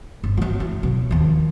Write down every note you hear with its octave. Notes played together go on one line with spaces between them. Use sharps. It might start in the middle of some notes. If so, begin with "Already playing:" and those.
G1
F3 F#3
E3
B2 F#3
D#2 F3